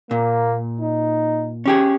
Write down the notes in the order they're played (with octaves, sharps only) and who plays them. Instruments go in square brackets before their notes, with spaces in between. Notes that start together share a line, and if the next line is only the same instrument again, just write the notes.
[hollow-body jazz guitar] A#2 [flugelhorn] A#3
[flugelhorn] D#4
[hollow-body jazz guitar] C#4 G4 G#4